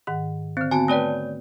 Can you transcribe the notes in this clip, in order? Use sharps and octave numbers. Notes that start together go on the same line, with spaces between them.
G#2 D#3 F#5
D3 C4 C5
B3 C4 F#4 G#5 A5
A3 B4 C#5 D5 G5 G#5